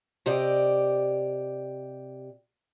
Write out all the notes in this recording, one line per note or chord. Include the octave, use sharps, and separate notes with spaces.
C3 G4 D5 D#5